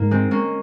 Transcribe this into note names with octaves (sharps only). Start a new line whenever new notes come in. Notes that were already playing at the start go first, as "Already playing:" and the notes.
Already playing: G#2 A#3
G#3 C4
A#3 C#4